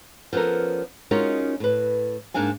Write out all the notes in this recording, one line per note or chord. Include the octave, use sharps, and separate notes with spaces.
F3 B3 C#4 A4 A#4
G#3 C#4 D#4 F4 F#4 A#4
A2 B4
G#2 A#3 D4 F5 G#5